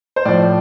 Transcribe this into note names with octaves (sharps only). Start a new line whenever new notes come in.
C5
A2 F3 D5